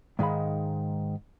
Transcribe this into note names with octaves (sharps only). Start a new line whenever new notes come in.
G#2 D#3 G#3 F5 B5